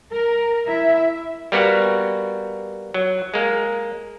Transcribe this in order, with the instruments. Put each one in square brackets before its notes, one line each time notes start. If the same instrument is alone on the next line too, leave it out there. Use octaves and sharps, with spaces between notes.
[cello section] A#4
E4 E5
[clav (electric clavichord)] G3 A#3 B3 F#4
F#3
G#3 A#3